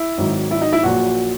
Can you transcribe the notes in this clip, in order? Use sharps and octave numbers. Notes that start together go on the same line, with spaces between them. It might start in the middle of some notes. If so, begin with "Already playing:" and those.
Already playing: E4
G#1 G#2 D#3 F#3
E4
D#4
E4
A#1 A#2 F#3 F#4